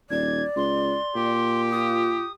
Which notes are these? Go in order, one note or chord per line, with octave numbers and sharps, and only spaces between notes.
D#1 D5 G#6
C#2 C6
A#2 G4
F4 D#6